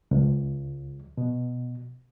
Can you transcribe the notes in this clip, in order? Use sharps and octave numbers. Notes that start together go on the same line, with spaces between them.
C#2
B2